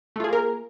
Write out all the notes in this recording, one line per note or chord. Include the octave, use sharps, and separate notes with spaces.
A3 A#3 F4 G#4 A#4